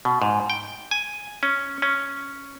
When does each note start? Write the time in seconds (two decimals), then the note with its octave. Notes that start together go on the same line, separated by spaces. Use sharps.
0.05 B2
0.22 G#2
0.50 G5
0.91 G#5
1.43 C#4
1.82 C#4